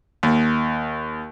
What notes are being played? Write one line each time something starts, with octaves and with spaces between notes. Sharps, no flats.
D#2